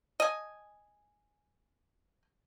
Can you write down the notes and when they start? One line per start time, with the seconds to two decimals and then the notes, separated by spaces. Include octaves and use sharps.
0.20 D#5 G#5